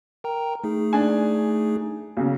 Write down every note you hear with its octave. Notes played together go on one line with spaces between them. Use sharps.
A#4 G5 A#5
A3 D#4 G#4
D4 G#5
B1 C#3